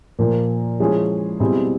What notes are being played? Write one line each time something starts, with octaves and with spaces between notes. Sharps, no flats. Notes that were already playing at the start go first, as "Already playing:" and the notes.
A#2 F3 A#3
F3 G#3 C#4 E4 G#4
B2 G3 C4 E4 G#4